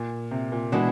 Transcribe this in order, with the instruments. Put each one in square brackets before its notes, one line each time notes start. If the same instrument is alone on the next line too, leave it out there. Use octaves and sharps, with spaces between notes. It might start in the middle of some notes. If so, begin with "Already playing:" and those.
Already playing: [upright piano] A#2
C3
A#2
[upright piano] B2 [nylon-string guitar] E3 G#3 B3 D4 F#4